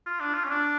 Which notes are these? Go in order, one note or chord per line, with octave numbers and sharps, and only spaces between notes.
F4
D4
F4
C#4
D4